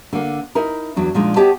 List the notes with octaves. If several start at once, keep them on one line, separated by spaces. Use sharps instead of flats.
D3 A#3
D#4 E4 A#4
E2 F#3 D4
A#2 F3 G#3 D4 D#4
B3 G4 C#5 D#5 A5